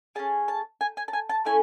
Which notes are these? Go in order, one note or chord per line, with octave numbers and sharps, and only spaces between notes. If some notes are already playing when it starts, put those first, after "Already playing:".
C#4 G#4 A5
A5
G#5
G#5
A5
G#5
A5
A3 C#4 E4 A4 G#5